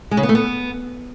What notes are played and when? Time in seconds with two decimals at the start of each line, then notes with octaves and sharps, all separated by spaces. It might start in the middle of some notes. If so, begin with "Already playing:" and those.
0.11 G#3
0.17 C#3
0.23 B3
0.29 A3
0.35 B3